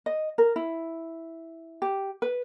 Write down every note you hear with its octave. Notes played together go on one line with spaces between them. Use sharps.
D#5
A#4
E4
G4
B4